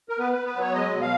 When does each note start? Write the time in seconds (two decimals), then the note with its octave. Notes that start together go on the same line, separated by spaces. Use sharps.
0.09 A#4
0.19 B3 B4
0.33 B3 B4
0.47 B4
0.56 F#3 C#5
0.74 G#3 D#5
0.93 B2
1.02 F5